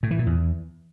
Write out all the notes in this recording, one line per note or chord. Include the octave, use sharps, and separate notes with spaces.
A2
E3
A#2
E2